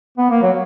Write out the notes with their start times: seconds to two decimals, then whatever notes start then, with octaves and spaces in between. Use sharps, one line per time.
0.18 B3
0.30 A#3
0.42 F#3